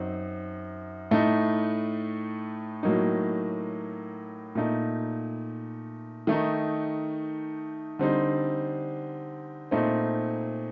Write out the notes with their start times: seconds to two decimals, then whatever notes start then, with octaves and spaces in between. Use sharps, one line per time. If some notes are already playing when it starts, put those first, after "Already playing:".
Already playing: F#2 C4 D#4
1.11 A2 A3 D#4
2.83 A2 F#3 A#3 D#4
4.55 A#2 A3 D#4
6.27 D#3 A3 D#4
7.99 D3 G3 C4 D#4
9.71 A#2 A3 C4 D#4